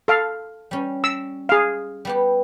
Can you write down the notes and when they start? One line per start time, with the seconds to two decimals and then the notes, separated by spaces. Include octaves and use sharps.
0.08 A4 F5
0.71 G3 C#4
1.04 E6
1.49 G#4 F5
2.05 G3 B3 G4